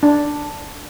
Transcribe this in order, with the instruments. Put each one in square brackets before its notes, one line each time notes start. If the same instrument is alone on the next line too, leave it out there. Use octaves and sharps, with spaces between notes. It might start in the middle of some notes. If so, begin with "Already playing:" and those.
[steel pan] D4